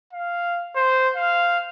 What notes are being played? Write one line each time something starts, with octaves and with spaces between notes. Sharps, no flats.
F5
C5
F5